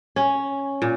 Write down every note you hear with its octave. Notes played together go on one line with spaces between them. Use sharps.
C#4
A#2